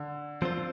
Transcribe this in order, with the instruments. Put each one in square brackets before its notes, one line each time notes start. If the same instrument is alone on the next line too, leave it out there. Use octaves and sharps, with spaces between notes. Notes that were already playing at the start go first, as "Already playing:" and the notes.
Already playing: [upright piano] D3
[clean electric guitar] F3 C4 F4 C5